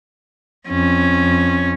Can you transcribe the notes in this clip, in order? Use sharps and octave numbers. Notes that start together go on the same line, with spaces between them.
F2 C#4